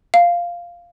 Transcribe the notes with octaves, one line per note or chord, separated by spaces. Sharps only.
F5